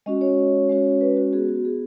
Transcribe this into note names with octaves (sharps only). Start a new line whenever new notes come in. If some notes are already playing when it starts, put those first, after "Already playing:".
G#3 C#4 F#4 D#5
C#5
G#3 C#4 F#4
B4
F#4
B3 F#4 G#4
F#4
G#4